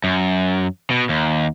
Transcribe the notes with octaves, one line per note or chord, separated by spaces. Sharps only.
F#2
B2
D#2